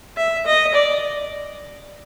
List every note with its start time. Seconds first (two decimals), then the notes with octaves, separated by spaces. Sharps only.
0.17 E5
0.46 D#5
0.74 D5